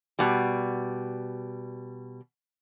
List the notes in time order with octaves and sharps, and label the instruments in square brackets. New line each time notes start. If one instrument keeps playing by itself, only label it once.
[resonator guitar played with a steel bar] B2 G3